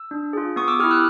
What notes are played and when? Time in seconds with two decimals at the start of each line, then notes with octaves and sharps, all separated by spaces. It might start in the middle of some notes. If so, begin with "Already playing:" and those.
Already playing: E6
0.11 D4
0.33 F4 G#4
0.56 B3 C#6 D#6
0.68 D6 E6
0.79 E4 G4 D#6 F6
0.91 E6 F#6